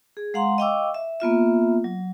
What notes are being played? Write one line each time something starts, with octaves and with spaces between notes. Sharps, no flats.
G#4
G#3 F5 F#5 A#5 C6
D#5 F5 G5 C#6 D6 E6
E5
A#3 B3 F4 E5
F#3